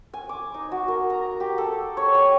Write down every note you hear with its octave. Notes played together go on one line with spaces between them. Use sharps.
G#5
D6
D#4
F#4
A#4
A#5
G4
A4
C#5
G5